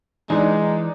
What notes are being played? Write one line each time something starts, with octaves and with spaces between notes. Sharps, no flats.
E3 G#3 D4 D#4